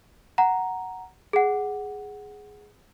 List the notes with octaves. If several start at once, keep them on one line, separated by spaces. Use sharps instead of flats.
F#5 A#5
G#4 F#5